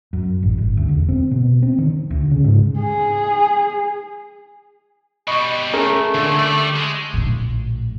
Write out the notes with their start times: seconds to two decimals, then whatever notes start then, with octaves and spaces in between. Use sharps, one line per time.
0.13 F#2
0.43 A1
0.58 G1
0.77 D2
0.89 E1
1.09 C4
1.31 B2
1.62 C4
1.78 D#3
2.10 D2
2.31 C#3
2.44 G#2
2.80 G#4
5.28 B2 G3 D#5 B5 C#6
5.73 A3 C#4 G#4 A#4
6.14 A#2 D3 G#3
6.39 G3 D5
6.76 G#3
7.13 A#1 A2